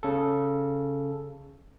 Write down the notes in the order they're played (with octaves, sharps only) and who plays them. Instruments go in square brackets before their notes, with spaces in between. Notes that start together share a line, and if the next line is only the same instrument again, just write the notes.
[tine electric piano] C#3 A4